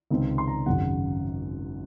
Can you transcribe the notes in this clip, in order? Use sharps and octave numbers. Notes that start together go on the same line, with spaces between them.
C#2 C3 D#3 G#3 C4
C6
A#5
G#1 F#2 C#3 F#5